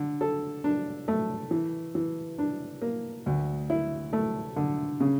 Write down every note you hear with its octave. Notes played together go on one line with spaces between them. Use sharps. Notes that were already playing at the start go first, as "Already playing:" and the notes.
Already playing: D3
A4
D4
A3
E3
E3
D4
A#3
D2
E4
A3
D3
C#3